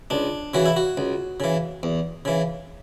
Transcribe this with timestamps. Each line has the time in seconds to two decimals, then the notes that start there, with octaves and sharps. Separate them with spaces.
0.10 C#2 D4
0.54 C#3 E3 F#4
0.66 E4
0.76 F#4
0.97 C#2
1.40 C#3 E3
1.83 E2
2.25 C#3 E3